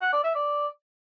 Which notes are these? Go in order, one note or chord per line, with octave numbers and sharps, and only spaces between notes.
F#5
D5
E5
D5